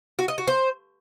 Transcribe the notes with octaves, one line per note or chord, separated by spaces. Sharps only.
F#4
D#5
F#4
C5